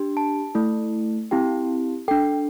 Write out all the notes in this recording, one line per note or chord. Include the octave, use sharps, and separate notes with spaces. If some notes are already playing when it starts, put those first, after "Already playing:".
Already playing: D4 G4
A5
A3 E4 A4
C4 E4 G4 G5
D4 A4 G5